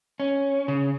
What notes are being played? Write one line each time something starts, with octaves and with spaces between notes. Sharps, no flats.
C#4
C#3